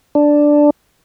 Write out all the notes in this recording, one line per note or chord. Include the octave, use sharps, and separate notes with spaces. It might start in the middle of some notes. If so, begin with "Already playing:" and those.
D4